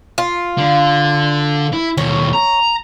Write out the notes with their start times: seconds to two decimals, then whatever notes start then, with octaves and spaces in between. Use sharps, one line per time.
0.18 F4
0.58 D3
1.73 E4
1.97 D#2 B2 C#5
2.33 A#5